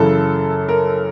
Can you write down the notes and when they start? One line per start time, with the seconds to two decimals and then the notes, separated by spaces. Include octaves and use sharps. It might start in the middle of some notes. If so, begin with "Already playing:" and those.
Already playing: F#2 C#3 E3 A4
0.69 A#4